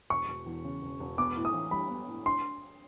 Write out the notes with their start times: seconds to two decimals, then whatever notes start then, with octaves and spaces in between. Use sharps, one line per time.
0.10 E1 C#6
0.28 E1
0.46 E2
0.64 C#3
0.82 E1
1.00 E1
1.18 B3 D6
1.36 A2
1.45 D#6
1.53 E3
1.71 G3 B5
1.90 B3
2.08 A2
2.26 D4 C6